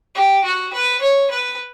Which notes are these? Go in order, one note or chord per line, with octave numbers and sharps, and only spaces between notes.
G4
F#4
B4
C#5
B4